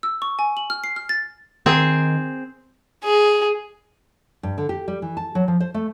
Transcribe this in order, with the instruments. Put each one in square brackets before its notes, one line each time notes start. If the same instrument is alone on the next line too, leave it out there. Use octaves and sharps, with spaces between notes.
[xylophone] E6
C#6
G#5
F#7
F6
C7
F6
A6
[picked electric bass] D#3 [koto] C4 G#4
[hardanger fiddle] G#4
[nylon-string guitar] G2
D3
G4
G3
E3
A5
F#3
F3
C5
A3